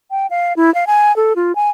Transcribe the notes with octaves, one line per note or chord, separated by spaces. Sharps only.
G5
F5
E4
F5
G#5
A4
F4
G#5